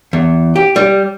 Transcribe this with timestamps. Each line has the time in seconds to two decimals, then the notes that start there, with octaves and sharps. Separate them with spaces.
0.13 E2
0.56 G4
0.76 G3